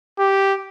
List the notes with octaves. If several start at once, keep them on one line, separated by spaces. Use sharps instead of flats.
G4